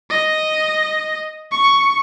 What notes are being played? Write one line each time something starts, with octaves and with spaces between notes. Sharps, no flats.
D#5
C#6